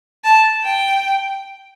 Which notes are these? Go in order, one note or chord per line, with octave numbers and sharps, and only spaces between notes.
A5
G5